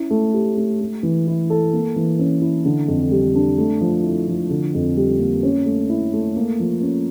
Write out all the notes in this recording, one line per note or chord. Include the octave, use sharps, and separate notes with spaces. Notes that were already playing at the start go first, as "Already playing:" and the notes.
Already playing: C#4 E4
A3
G4
A3
A3
E3
E4
A4
A#3
E3
C#4
E4
D3
F2
G3
D4
A3
F3
E4
F3
D3
F2
G3
A#3
C#4
A3
E4
A3
A#3
F3
C#4